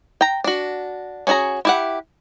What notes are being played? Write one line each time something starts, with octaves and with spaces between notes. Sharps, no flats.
G5 A#5
D4 F#4
C#4 D4 F#4 G#4 A#5
E4 G4 F#5